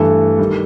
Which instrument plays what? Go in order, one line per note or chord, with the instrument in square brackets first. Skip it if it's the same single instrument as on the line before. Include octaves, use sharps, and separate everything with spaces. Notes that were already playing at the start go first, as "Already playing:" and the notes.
Already playing: [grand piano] G2 E3 A3 A4
D#3 G3